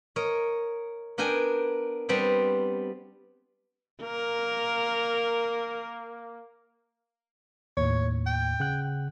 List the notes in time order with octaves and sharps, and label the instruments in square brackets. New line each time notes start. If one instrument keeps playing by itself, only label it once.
[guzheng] A#4 C#5 D#5
B3 D4 A#4 G5 G#5
G3 B3 C4 D4
[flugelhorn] A#3 [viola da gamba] A#4
[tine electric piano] D#2 A2 [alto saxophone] C#5
[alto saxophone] G5
[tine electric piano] C#3 F#5 F#6